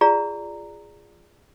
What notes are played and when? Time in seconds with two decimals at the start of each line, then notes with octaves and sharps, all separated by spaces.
0.01 F4 G#4 D5 A#5